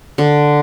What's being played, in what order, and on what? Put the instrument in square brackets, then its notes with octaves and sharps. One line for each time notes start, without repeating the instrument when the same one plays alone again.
[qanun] D3